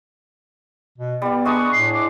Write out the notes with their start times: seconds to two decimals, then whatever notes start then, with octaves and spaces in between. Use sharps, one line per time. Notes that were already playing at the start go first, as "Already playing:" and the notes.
0.98 B2
1.22 G3 B3 D5
1.45 G#3 D4 C#6 D#6
1.72 A2 C7
1.94 D6